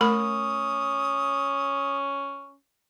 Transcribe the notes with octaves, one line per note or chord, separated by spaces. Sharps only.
A3 C#4 A#4 B5 D#6